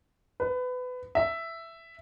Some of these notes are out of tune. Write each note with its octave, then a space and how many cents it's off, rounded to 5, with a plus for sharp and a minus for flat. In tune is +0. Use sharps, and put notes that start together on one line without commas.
B4 +25
E5 +5